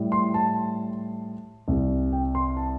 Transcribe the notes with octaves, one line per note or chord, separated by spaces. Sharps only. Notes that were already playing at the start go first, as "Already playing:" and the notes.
Already playing: A2 G3
C6
A5
C2 C3 G3
G5
C6
A5